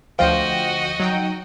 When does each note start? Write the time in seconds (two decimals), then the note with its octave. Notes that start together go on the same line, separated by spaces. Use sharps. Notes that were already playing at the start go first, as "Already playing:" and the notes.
0.19 D2 F3 F#4 C5 D#5 F5 G5
1.00 F#3 D#4 G5